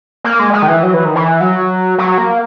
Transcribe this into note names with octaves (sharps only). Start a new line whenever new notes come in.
A#3
G#3
G#3
D#3
E3
F#3
E3
D#3
E3
F#3
F#3
A#3